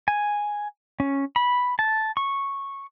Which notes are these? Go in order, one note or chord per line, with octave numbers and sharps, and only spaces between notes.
G#5
C#4
B5
A5
C#6